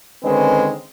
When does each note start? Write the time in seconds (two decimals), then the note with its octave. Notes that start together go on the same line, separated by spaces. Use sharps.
0.23 D3 D#3 G#3 C4 C#4 B4